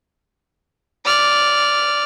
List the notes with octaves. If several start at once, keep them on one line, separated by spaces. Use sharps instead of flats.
D5 F6